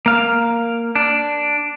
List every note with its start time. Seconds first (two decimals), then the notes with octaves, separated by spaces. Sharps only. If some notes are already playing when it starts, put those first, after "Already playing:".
0.06 A#3 F5
0.95 D4